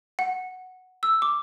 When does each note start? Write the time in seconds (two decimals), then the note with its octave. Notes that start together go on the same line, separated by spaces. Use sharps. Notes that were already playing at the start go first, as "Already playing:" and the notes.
0.19 F#5
1.03 E6
1.22 D6